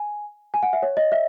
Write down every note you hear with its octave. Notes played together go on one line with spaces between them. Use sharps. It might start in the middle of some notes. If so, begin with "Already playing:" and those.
Already playing: G#5
G#5
F#5
E5
C#5
D#5
E5